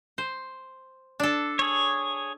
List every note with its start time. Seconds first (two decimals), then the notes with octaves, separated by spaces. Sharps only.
0.18 C5
1.20 D4 A4
1.59 G#4 C#5